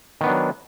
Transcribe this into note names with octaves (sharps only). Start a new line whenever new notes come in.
D#3 F#3 B3 D4